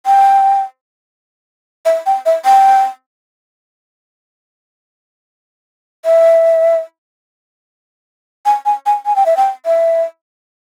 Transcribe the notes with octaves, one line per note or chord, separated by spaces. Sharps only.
G5
E5
G5
E5
G5
E5
G#5
G#5
G#5
G#5
G5
E5
G5
E5